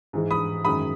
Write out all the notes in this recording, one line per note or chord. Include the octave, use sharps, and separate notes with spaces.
G#2 E3 G#3
B5 D#6
F#2 D#3 G#3 B5 D#6